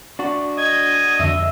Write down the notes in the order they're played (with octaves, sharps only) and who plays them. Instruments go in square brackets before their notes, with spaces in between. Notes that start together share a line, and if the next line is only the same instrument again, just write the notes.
[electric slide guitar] D4 F#4
[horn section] D#5 [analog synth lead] G#6
[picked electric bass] F2 D3 [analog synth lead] E5